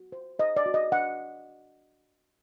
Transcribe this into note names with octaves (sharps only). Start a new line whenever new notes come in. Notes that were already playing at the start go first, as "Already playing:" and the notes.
Already playing: F#4
C5
C5 D#5
D5
F#4
D#5
D4 F#5